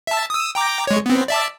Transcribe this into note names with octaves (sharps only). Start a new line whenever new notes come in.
E5 A5
D#6 E6
G5 A#5 D6
G#3 C#5
B3 C4
D5 E5 A5